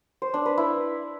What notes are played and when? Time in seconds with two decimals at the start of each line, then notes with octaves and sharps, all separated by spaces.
0.22 C5
0.34 D4
0.46 B4
0.58 E4